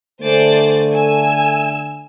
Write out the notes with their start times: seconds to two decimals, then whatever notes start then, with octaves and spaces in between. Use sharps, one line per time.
0.22 D3 A3 C5 D5 G#5
0.93 G#5 E6